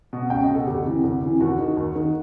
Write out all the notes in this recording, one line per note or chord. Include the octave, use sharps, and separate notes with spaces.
B2
C#2 G5
D#5
B2
A4
D2 G4
C3 E3
D2
C3 E3
D#2 F#4
D#3
D#2
D#3